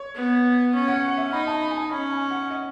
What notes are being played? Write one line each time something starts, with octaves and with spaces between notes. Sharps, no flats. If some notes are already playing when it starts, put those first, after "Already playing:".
Already playing: C#5
B3
C#4
F#5
F#5
E5
D#4 B5
A5
B5
G#5
A5
C#4 B5
G#5
F#5
D#5